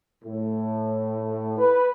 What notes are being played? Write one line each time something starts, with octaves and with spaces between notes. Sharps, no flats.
A2
B4